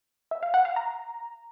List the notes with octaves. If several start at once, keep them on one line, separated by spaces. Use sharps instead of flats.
E5
F5
F#5
F5
A#5